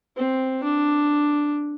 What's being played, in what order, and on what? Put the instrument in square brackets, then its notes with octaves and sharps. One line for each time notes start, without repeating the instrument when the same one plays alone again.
[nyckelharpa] C4
D4